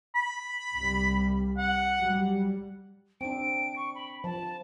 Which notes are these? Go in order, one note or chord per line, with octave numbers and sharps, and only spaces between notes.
B5
C2 G3
F#5
F#3 G3
C4 D4 D7
C#6
B5
F3 A5